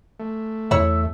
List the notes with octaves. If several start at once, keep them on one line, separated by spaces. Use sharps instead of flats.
A3
E2 E4 C#5 E5